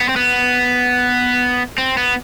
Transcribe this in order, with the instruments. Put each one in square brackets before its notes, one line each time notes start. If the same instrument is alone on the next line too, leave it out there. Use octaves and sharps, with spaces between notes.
[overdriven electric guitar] B3
C4
B3
C4
B3